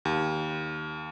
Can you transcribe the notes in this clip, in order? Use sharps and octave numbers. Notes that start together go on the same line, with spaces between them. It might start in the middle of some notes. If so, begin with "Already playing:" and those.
D#2